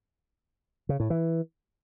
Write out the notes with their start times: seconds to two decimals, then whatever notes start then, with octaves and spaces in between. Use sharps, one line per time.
0.89 C#3
1.00 A2
1.10 E3